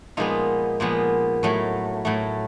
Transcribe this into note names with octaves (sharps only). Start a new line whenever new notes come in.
A#2 F3 G#3 B3 D#4 F4
A#2 F3 G#3 B3
A2 F#3 A3
A2 F#3 A3